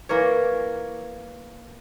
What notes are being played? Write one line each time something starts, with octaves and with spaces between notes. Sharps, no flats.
E3 A#3 A#4 C#5